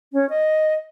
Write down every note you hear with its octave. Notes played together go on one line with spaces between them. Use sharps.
C#4
D#5